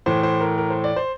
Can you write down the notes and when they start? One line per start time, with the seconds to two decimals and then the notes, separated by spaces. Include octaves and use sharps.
0.06 A2 E3 C5
0.23 C5
0.40 A#4
0.58 A#4
0.70 C5
0.84 D5
0.96 C5